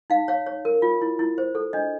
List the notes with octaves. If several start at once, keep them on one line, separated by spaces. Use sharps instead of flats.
D#4 F5
C#5 F5
C#5
A#4
F4
E4
E4
C5
A4
D4 D#5